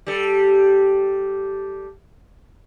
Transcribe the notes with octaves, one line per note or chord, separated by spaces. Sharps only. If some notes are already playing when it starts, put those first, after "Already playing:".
G3 A4